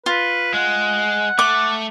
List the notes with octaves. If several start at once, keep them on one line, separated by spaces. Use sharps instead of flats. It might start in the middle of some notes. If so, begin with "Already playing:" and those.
F4 B4
G#3 F#5
A3 D6